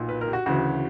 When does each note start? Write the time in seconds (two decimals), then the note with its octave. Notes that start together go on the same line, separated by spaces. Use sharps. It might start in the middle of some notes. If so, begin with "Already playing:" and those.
Already playing: B1 A#2
0.09 B4
0.21 A#4
0.28 G4
0.33 F#4
0.46 D2 C#3 E3 F#4